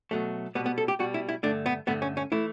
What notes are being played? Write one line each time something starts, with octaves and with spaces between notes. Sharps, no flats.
B2 F#3 A3
B2 G3 B3
B3
A4
G4
B2 G3 F#4
E4
E4
G2 D3 A3 D4
B3
G2 D3 A3 B3
C#4
C#4
E3 A3 E4